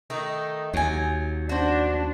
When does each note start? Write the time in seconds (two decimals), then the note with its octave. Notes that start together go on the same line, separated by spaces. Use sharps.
0.10 D#3 A3 D#4
0.74 D#2 F#3 G#5
1.49 D4 F#4 C5